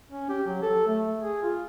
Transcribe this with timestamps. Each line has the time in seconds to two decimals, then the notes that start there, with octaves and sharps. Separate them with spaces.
0.11 C#4
0.29 G4
0.47 F#3
0.62 A4
0.87 A3
1.21 G#4
1.43 F4